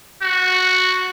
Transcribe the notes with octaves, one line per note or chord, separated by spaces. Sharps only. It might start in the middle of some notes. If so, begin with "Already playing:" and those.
F#4